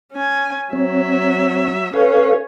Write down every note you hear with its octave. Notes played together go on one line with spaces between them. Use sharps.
C#4 G#5
F#3 C4 C#5 E5
C#4 A4 B4 C#5 F5